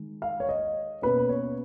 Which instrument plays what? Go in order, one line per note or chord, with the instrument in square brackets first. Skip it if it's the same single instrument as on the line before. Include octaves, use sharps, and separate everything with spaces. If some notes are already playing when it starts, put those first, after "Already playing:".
Already playing: [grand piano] D#3 G#3
F5
C#5
D#5
B2 A#3 C#4 B4
C#5